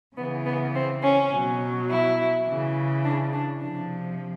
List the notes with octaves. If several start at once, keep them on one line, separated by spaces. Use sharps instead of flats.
C#3 E3 B3
B3
C4
C#4
B2 F#3
E4
C#3 E3
D4
D4
C3 F3 D4